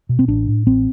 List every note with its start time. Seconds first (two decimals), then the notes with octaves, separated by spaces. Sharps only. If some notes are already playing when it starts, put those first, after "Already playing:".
0.09 B2
0.19 C4
0.28 A1 D4
0.48 A2
0.67 A1 C4